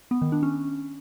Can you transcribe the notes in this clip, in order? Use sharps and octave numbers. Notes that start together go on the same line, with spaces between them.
B3
D#3
D4
C#4